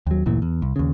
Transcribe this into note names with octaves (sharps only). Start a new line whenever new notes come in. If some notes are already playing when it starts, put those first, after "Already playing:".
D#2 F#3
G1 D2 A#2 E3
E2
C2
D#2 C#3